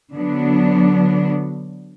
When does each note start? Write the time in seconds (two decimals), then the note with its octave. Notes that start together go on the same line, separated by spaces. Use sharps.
0.14 D3 F#3 B3 D4